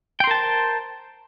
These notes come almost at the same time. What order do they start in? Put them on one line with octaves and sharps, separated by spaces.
G5 C6 A#4 A5 C5